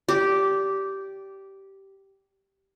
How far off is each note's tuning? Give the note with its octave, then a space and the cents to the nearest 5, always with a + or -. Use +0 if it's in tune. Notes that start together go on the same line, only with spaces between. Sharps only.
G4 -10 D5 -20